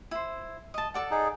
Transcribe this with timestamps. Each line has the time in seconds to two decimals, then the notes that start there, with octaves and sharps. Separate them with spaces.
0.11 E4 C5
0.74 D#5 A5
0.94 A4 D5 F#5
1.11 D#4 G#4